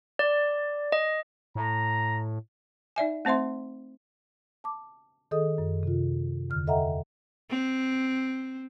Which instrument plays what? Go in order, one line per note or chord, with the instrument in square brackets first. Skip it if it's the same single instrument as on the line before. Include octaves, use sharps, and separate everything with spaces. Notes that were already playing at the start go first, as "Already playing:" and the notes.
[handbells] D5
D#5
[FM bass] A2 [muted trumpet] A#5
[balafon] D#4 D5 E5 G#5
A3 C4 C5 E5 C6
[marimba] A5 D6
D#3 G#4 A4 D#5 D#6
F#2
C3 F4
E2 D3 F6
A4 D#5 E5 F#5 G5 A#5
[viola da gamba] C4